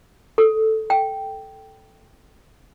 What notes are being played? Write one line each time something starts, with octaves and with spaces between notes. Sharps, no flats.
A4
G5